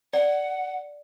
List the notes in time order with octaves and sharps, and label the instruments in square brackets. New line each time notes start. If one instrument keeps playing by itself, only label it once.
[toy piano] D5 [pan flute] F#5